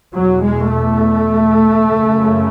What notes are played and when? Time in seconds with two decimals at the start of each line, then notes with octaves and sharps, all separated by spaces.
0.14 E2 B2 F#3
0.43 G#3
0.72 A3
1.86 F#2 C#3